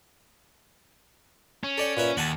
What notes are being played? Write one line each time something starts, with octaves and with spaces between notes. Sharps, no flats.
C#4
A4 D5 G5
A#2 B4 E5
D#2 F#5 G#5 A5